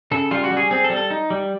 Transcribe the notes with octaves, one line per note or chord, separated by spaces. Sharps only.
C#3 A4
G3 F4
F#4
G3
G#4
C4 G#4
A4
G3
A4
D#4
G3